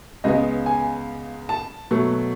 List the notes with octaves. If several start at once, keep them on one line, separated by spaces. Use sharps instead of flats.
C#2 C#3 G#3 B3 D#5
G#5
A5
B2 F#3 A3